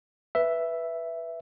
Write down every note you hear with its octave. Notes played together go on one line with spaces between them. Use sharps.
B4 E5